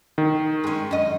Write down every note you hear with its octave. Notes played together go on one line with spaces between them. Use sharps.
D#3
G#3 C#4
F#2 D#5